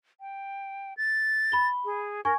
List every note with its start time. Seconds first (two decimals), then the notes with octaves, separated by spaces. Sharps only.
0.21 G5
0.97 A6
1.52 B5 G7
1.85 G#4
2.25 A#4 G#5 C#6 G#6